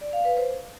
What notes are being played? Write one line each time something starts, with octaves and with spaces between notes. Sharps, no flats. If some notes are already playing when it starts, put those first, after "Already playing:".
D5
F5
B4
C5